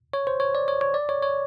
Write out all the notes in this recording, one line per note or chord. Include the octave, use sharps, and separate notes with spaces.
C#5
C5
C#5
D5
C#5
C#5
D5
C#5
C#5